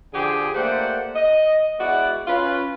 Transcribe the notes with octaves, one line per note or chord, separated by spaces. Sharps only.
D3 F3 G4 G#4
A3 A#3 G4 C5 D5 F#5
D#5
G#3 B3 E4 F#4 D5 F#5
C#4 F4 B4